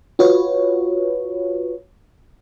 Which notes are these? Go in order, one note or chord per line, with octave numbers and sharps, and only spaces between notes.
F4 F#4 B4 C#5